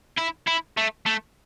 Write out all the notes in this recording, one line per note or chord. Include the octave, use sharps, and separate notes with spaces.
E4
E4
A3
A3